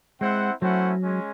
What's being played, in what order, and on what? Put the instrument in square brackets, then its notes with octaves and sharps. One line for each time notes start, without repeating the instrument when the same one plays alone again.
[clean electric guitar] G#3 [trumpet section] C4 E4 C5 F#5
[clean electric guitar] F#3 [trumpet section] A3 C#4 E4 C5 F#5
[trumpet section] G#3 C#4